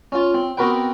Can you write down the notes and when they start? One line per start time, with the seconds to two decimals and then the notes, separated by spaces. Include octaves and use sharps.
0.12 C#4 F4
0.34 C4
0.57 B3 C4 F#4 A#4 B4 G5